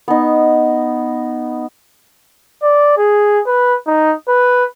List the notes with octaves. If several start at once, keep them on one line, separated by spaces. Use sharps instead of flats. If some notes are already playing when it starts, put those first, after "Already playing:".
B3 D#4
D5
G#4
B4
D#4
B4